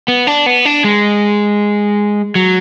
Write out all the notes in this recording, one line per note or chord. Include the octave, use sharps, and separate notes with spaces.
B3
D4
B3
D4
G#3
F#3